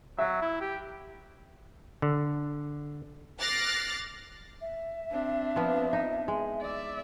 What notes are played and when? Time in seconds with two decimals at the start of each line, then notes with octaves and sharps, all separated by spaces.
0.18 F#3 E5
0.42 E4
0.61 G4
2.02 D3
3.40 D6 F6 F#6 A6 A#6 C7
4.61 E5
5.11 C4 D4
5.56 F3 B3 F4
5.93 D#4
6.28 G#3
6.62 D5 E5